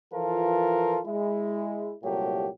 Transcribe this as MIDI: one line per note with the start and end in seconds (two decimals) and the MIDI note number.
0.13 0.98 52
0.13 0.98 53
0.13 0.98 65
0.13 0.98 69
0.13 0.98 70
1.06 1.94 56
1.06 1.94 64
2.03 2.48 36
2.03 2.48 46
2.03 2.48 54
2.03 2.48 57
2.03 2.48 67